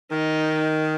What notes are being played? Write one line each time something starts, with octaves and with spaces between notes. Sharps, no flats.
D#3 D#4